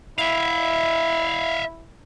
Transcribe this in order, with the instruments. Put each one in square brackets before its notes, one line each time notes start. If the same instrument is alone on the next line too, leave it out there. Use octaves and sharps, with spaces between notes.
[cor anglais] E4 [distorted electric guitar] E5 F5